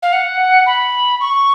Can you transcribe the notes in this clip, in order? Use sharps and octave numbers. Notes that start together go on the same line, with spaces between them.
F5
F#5
B5
C#6